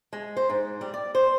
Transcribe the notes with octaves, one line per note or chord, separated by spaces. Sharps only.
G#3
C5
G#2
G3
D5
C5